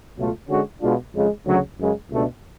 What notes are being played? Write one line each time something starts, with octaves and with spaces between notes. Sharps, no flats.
C#2 B2 F#3 A3 F4
D3 G#3 C#4 F#4
B2 G#3 D4 F4
F2 C#3 G#3
D2 C#3 F#3
F#2 C#3 G#3
C#2 B2 A3 D4